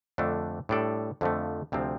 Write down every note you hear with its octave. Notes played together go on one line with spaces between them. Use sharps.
F2 D3 A3 D4
A2 G3 D4 A4 D5
F2 D3 F3 A3
D2 C3 F3 C4